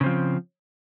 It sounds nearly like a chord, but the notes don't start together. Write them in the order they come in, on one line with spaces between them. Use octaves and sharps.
C#3 C4 F3